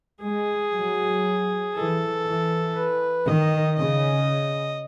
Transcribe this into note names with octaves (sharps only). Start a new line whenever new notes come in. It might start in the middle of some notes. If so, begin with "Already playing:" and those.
G#3 G#4
F#3
E3 A4
E3
B4
D#3 D#5
C#3 D#5